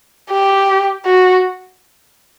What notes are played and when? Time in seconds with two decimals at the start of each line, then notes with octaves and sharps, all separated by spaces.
0.30 G4
1.06 F#4